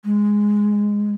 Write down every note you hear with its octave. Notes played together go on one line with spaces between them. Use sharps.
G#3